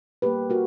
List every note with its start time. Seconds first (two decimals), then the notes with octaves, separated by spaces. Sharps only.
0.22 A#2 G3 A#3 G4 B4
0.50 F#4 A#4